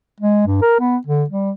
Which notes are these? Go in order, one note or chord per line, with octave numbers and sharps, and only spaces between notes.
G#3
G2
A#4
B3
D3
G3